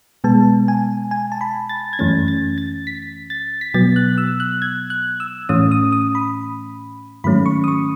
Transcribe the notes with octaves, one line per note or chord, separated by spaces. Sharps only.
B2 G#3 B3 A5
G#5
G#5
A5
B5
A6
G#6
F#2 E3 A3 C#4 A6
A6
A6
B6
A6
B6
B2 F#3 B3 A6
F#6
E6
F#6
G#6
F#6
E6
A2 E3 A3 C#4 D#6
D#6
D#6
B5
G#2 D#3 F#3 A3 C#4 B5
C#6
D#6
C#6